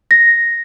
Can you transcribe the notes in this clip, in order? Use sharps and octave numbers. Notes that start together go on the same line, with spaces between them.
A#6